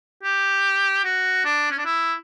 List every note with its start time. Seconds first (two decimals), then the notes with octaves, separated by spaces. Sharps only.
0.23 G4
1.04 F#4
1.45 D4
1.71 C#4
1.78 D4
1.85 E4